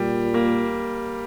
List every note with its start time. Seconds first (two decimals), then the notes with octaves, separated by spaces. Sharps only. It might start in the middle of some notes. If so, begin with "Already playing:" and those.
Already playing: A#2 G3
0.34 A#3